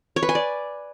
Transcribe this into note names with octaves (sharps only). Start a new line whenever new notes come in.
C#5
B4
G#5
D5